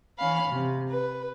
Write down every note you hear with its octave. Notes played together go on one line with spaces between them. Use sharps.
E3 C#4 F5 B5
C3
B4